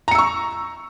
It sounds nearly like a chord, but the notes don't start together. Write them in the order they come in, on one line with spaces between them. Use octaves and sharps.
A#5 C#7 E6 C#6